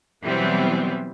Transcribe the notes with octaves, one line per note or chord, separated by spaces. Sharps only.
B2 E3 F#3 G3 B3 C4